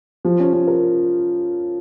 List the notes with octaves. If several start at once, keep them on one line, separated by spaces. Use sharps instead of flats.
F3
C#4
C#4
A#4